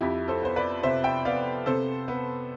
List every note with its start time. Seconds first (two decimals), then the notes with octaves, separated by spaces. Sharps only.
0.01 F2 E4 G4
0.28 A4 C5
0.42 B3 C5
0.56 B4 D5
0.83 C3 C5 E5
1.04 E5 G5
1.25 B3 D5 F5
1.66 C3 A4 C5
2.08 B3